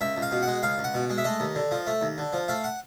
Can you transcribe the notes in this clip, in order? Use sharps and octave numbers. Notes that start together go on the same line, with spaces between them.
C#2 E5
C#2
F5
B2
F#5
G#3
C#2 F5
C#2
F#5
B2
G#3
E5
A3 D#5
D#2
D3
F3
A3
D#2
D3
F3
A3 F5
F#5